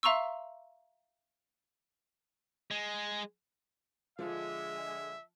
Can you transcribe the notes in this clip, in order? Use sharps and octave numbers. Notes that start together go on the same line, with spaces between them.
E5 F5 A#5 C6 C#6 E6
G#3
D3 F3 G#3 F4 E5